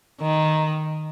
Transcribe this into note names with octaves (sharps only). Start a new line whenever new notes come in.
D#3